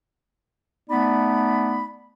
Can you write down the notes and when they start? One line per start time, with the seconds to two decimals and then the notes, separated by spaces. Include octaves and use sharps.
0.89 A3 B3 D#4 D5 B5